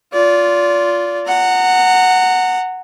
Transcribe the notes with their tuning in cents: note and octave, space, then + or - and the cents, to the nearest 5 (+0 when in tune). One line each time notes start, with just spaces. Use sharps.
F4 +0 D5 -30
F#5 +0 A#5 -30